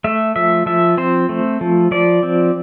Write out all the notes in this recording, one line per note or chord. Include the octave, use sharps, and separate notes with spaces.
A3 E5
F3 E5
F3 E5
C4 C5
A3
F3
F3 D5
C4